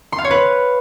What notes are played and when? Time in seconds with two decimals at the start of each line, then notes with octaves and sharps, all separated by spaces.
0.12 C6
0.18 F5
0.25 C#5
0.31 B4